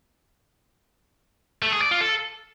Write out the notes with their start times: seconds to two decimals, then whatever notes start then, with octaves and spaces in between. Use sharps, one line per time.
1.62 A3
1.72 G#4
1.82 D5
1.91 F4
2.01 A4